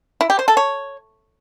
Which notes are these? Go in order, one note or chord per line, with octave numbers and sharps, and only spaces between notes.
E4
G4
C5
A4
C#5